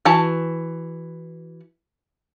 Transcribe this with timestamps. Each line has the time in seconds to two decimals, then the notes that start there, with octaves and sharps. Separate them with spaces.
0.05 E3 F#4 A5